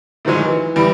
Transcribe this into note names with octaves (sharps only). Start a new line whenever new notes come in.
A2 D#3 F3 F#3 G#3
E3
E2 E3 G3